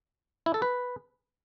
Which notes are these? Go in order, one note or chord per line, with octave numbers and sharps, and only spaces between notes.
E4
A4
B4